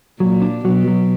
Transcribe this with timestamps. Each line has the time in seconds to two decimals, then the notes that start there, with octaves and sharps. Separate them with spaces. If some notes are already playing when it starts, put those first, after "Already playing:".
0.20 A#2 F#3
0.42 D4
0.65 B2 F#3
0.87 F#3